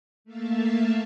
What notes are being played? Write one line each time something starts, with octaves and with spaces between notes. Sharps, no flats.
A3 A#3 E5 F5 A5